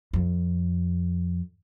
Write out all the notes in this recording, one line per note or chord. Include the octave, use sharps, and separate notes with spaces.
F2